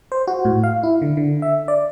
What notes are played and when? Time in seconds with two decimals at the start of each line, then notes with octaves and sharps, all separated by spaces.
0.12 C5
0.27 F#4
0.45 A2
0.63 F5
0.83 E4
1.02 D3
1.17 D3
1.42 E5
1.68 D5